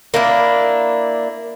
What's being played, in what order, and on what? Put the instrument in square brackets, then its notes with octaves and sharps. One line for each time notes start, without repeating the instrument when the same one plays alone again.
[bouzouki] A#3 D4 E4